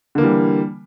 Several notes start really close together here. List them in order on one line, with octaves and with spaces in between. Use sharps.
D3 A#3 E3 G3